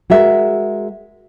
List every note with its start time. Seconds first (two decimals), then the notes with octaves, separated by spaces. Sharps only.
0.10 G#3 F#4 A#4 E5